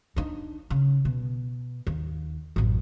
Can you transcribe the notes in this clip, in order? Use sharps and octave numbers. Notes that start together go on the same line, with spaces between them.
D4 D#4
C#3
B2
D#2
A1 F#2